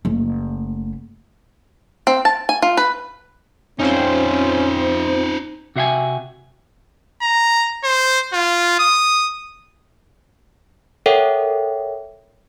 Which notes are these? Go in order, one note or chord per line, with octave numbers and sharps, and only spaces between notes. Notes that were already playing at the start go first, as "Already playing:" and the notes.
F#1 A3
C4
A5
G#5
F4
B4
F2 C4 C#4 D#4 F4 C5
C3 F#4 E5 F5 G5 G#5
A#5
C5
F4
D#6
A4 A#4 C#5 E5 F#5 G5